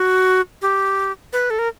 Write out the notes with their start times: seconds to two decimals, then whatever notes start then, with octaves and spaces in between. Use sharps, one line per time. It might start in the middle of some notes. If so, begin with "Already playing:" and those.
Already playing: F#4
0.62 G4
1.33 B4
1.50 A4
1.59 A#4